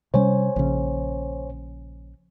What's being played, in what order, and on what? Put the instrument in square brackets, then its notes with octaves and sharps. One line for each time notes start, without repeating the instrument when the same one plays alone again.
[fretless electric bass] C3 G3 C#4 [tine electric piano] C5 C#5 G#5
[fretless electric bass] A#1 C#3